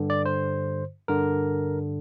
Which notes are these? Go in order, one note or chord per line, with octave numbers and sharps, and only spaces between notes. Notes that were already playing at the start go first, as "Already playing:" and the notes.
Already playing: G2 D3
D5
C5
G2 D3 A#4